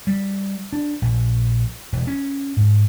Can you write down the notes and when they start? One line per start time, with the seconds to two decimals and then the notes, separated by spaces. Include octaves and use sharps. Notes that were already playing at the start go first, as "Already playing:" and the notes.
0.07 G3
0.73 D4
1.02 A#1
1.92 E1
2.07 C#4
2.57 G#2